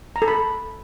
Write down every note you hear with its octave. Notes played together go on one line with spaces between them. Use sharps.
A#5
A4
B5